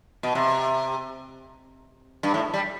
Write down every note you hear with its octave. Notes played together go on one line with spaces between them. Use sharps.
B2
C3
G2
A2
G3